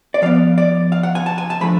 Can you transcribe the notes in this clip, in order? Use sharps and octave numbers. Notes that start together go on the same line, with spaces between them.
D5
F3 B3 F5
D5
F5
F#5
G#5
A5
G#5
A5
D3 F3 A3 B5